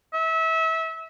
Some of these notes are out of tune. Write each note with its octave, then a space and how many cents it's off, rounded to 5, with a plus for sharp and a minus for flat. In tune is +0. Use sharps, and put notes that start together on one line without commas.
E5 -25